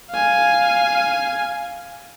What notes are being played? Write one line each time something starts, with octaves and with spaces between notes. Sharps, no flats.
F5 G#5